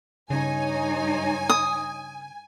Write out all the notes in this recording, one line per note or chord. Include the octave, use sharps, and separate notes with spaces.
G2 C#3 D#4 C#5 G#5
D#6